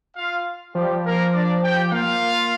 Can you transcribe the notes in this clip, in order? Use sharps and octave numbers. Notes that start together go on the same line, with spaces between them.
F4 F5
F3 G3 G4
A#3 A#4
D4 D5
G4 G5
A#3 F4 F5